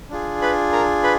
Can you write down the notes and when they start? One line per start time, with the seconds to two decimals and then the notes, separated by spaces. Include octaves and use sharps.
0.10 D4 F4 G#4
0.42 B4 B5
0.72 A#4 A#5
1.03 B4 B5